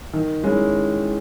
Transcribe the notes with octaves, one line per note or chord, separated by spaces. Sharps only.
D#3
G#3 C#4 E4